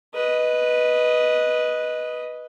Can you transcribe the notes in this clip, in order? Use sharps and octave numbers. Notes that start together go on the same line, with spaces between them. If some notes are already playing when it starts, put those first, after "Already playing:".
B4 D#5